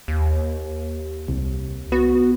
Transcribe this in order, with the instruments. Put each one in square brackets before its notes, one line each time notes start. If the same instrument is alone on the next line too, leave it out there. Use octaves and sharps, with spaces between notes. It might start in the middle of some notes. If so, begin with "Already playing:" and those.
[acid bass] D#2
[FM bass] C2
[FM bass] B3 [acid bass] F#4